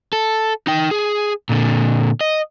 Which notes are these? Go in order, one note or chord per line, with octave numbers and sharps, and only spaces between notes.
A4
D#4 G5
G#4
A#2 D3
D#5